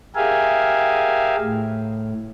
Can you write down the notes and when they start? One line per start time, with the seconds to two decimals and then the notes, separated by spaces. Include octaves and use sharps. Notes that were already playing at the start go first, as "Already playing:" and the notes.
0.15 G4 G#4 A#4 E5 F5 G#5
1.41 A2